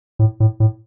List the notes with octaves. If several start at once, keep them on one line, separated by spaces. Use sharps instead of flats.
A2
A2
A2